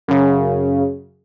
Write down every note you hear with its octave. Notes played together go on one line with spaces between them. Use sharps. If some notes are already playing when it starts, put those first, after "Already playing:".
F#2 C#3